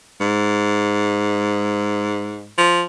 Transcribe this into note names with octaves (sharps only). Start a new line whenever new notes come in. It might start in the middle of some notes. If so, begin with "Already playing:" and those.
G#2
F3